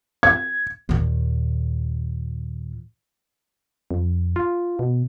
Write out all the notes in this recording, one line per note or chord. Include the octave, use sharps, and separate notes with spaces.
G#6
D#2 A#2
F2
F4
B2